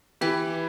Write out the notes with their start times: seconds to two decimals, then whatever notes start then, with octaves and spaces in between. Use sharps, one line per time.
0.21 E3 G4 B4